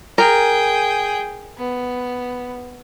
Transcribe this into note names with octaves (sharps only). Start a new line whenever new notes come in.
G#4 A#4 G5
B3